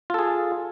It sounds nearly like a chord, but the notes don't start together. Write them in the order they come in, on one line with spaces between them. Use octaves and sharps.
F4 A4 G#4